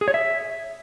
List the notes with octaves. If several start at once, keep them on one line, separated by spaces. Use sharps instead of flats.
G#4
C#5
E5